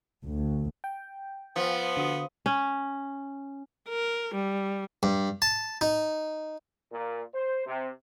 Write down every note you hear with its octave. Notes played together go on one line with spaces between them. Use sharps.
D2
G5
F3 B3
D3 F#4 D#6
C#4
A#4
G3
G2
A5
D#4
A#2
C5
C3